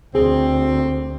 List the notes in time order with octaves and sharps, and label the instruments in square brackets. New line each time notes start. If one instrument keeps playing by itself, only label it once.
[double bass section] D2 [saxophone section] C4 [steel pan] G#4 C5